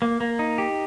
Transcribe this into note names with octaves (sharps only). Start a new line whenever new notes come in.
A#3
A#3
D#4
G4